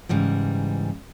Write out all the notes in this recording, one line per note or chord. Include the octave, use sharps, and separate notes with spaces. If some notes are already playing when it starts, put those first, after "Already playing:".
G#2 C#3 E3 G3